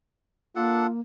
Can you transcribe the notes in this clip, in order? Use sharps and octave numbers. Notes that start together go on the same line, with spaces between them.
A#3 D4 F4 A4 F#5